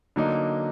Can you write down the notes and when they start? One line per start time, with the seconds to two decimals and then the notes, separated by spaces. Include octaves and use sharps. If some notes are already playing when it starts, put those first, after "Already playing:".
0.16 D3 F#3 A#3 D#4